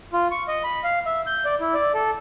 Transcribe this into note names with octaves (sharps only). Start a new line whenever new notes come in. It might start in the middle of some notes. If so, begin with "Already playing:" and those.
F4
C#6
D#5
B5
F5
E5
G6
D5
E4
D5
A4